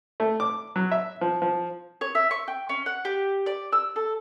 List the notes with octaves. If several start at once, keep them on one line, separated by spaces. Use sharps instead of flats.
A3
D6
F#3
E5
F3
F3
C#5
E5
C#6
G5
C#4
F#5
G4
D5
E6
A4